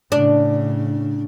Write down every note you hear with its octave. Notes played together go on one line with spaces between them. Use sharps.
A2 C#3 D4